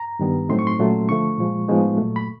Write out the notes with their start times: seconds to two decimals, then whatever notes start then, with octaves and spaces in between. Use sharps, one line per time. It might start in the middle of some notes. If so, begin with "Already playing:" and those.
Already playing: A#5
0.19 G2 D#3 G3 B3
0.49 A2 F#3 A3 C4 D#4 C6
0.59 C#6
0.67 C6
0.79 A#2 F#3 A3 C#4
1.09 D3 F3 A3 C#6
1.38 A#2 F3 G#3
1.68 A2 F3 G#3 B3 D#4
1.97 A#2 F#3 A3
2.16 B5